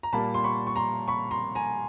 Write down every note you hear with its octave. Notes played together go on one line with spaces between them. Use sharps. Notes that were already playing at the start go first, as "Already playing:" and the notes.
A#5
A#2 G3 A#3 A5 B5
C6
B5 C#6
C#6
A#5 C6
B5 C#6
A#5 C6
G#5 A#5